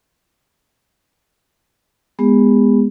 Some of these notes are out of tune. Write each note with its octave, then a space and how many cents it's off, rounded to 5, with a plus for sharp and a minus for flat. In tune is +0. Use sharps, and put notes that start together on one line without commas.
G#3 +0 B3 +0 G#4 -45